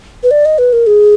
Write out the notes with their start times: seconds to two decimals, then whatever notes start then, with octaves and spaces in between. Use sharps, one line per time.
0.23 B4
0.31 D5
0.45 D#5
0.58 B4
0.73 A#4
0.87 G#4